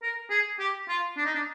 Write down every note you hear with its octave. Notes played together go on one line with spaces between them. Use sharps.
A#4
G#4
G4
F4
D4
D#4
D4